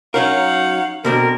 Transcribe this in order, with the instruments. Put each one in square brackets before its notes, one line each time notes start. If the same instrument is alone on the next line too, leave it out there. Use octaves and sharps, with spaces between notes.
[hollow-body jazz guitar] F#3 C#4 A#4 [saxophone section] D#4 C#5 F#5 [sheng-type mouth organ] F5
[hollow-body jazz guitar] B2 D3 C4 [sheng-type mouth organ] A#4